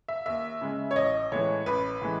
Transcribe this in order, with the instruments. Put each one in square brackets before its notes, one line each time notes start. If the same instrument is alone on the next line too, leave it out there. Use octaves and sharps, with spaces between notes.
[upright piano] E5
D#2 E5
C#3 G#3
C#5
A1 D#5
A2 E3 G#3 C#5
A1 B4
A2 E3 G#3